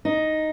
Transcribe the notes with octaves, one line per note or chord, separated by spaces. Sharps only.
D#4